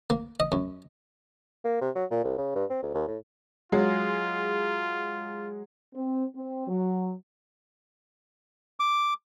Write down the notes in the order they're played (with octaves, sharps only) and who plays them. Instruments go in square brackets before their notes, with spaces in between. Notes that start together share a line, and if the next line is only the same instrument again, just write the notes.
[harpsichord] A#3
D#5
F#2
[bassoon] A#3
C3
F#3
A#2
C2
C#3
G2
C4
D2
D#2
A2
[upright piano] F#3 G#3 [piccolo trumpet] F4
[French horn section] C4
C4
F#3
[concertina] D6